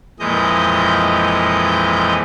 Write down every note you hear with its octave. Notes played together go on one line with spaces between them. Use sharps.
F2 A#2 E3 G#3 D#5 G6